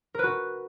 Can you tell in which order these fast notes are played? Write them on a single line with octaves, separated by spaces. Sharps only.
A#4 B4 F#4